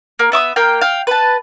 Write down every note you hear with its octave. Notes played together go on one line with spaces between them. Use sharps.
A#3
B3 E5 D6 D#6
A#3 F5 G5
F5 G5
B4 A5